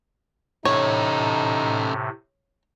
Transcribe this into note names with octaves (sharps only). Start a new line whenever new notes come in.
A2 C3 C#4 D#4 A4 C#5